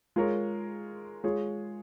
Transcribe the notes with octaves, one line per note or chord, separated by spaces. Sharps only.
G#3 F4 A#4 C#5
G#3 F4 G#4 C#5